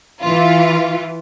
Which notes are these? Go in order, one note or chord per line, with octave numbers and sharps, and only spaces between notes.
E3 F4